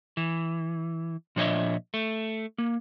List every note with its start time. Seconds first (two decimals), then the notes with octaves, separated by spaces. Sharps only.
0.17 E3
1.36 A#2 F3 D4 C#5 D#5 E5
1.94 A3
2.58 A#3